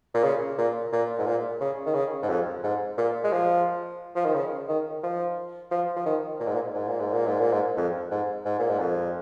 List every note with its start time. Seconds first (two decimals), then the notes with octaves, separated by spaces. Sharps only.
0.14 A#2
0.24 C#3
0.58 A#2
0.92 A#2
1.18 G#2
1.26 A#2
1.60 C#3
1.86 D#3
1.94 C#3
2.22 G#2
2.29 F2
2.63 G#2
2.98 A#2
3.24 G#3
3.32 F3
4.16 F3
4.25 D#3
4.34 C#3
4.69 D#3
5.03 F3
5.71 F3
5.96 F3
6.05 D#3
6.40 A#2
6.47 G#2
6.54 A#2
6.74 G#2
6.87 A#2
7.00 G#2
7.13 A#2
7.26 G#2
7.40 A#2
7.52 G#2
7.77 F2
8.11 G#2
8.45 G#2
8.59 A#2
8.69 G#2
8.79 F2